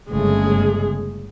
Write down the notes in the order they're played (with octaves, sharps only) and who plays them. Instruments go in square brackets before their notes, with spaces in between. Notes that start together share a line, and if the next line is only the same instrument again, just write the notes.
[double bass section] G1 C#3 A3 [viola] G#3 G#4